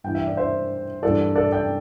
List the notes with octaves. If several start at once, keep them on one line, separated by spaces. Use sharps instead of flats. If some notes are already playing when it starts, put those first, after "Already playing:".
G2 E3 G5
E5
D5
C5 E5
G2 E3 A4 D5
A4 D5
D5 G5